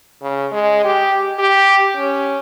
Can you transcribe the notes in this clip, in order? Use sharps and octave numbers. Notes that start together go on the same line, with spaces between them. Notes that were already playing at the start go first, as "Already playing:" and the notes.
C#3
G#3
G4
G4
C#4